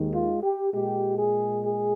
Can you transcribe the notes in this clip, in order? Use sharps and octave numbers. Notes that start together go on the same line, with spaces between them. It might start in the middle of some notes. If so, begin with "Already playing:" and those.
Already playing: D#2 D#3 G#3
F4
G4
A#2 G#3 G4
G#4
G#4